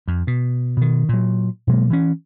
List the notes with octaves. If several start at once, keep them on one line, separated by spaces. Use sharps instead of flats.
F2
B2
B2 D#3
A#2 F#3
B2 F#3 G#3 A#3
E3 C#4